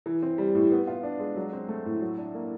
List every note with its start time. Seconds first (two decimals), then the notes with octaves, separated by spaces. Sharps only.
0.06 E3
0.22 C4
0.38 G3
0.55 A2
0.71 B3
0.87 F4
1.03 D4
1.20 G#3
1.36 F#3
1.53 C4
1.68 A3
1.85 A2
2.01 F#3
2.17 D4
2.35 A#3